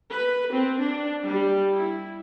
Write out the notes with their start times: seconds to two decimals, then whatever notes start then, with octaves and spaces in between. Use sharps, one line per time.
0.12 B4
0.51 C4
0.81 D4
1.24 G3
1.72 E4